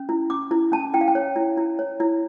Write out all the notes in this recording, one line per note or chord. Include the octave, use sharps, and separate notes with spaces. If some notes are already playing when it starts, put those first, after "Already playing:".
Already playing: C#4
E4
C#4 D6
E4
C#4 A5
E4 G5
F5
G5
C#5
E4
E4
C#5
E4